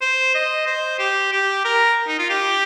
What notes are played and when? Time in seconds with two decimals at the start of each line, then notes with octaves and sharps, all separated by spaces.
0.02 C5
0.35 D#5
0.66 C5
0.99 G4
1.32 G4
1.65 A#4
2.08 D#4
2.19 F4
2.30 G4